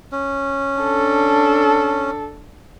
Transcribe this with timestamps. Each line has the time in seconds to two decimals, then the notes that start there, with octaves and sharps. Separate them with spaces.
0.12 C#4
0.80 D4 A4